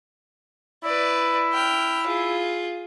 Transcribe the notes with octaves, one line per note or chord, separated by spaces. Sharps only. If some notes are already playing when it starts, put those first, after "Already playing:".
E4 B4 D5
G5 F6
F4 G#4